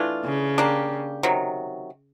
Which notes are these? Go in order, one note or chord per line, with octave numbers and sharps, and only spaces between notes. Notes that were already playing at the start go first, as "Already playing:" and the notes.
Already playing: E3 A3 D4 F4
C#3
A#3 D4 G4
C3 D#3 F#3